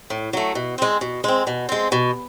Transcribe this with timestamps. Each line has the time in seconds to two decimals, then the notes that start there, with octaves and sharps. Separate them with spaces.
0.10 A2
0.33 F#3 A3
0.55 B2
0.78 G#3 C4
1.01 B2
1.24 G#3 C4
1.47 B2
1.69 G#3 C4
1.92 B2